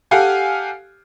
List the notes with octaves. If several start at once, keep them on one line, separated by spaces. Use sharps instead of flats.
G4 A4 F5 F#5 G#5